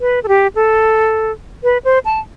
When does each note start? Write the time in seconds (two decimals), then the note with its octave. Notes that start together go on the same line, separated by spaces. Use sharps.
0.01 B4
0.24 A4
0.28 G4
0.55 A4
1.64 B4
1.85 C5
2.05 A5